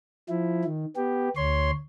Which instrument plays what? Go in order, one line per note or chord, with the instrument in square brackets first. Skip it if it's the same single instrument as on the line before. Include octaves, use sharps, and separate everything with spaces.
[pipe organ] F3 E4
D#3
B3 G4
D2 C#5 C6